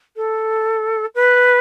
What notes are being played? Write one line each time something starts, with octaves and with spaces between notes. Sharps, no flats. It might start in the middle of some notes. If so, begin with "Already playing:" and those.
A4
B4